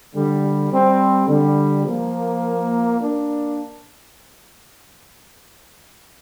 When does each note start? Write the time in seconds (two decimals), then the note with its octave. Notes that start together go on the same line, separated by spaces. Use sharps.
0.13 D3 G3
0.70 G3 C4
1.27 D3 G3
1.84 F3 A#3
2.98 A#3 D4